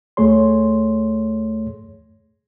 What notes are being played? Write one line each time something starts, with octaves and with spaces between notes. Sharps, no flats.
D#2 A3 G#4 C#5 C6